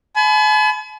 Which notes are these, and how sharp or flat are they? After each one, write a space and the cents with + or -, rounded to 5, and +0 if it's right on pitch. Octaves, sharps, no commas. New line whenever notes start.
G#5 +45 B5 +25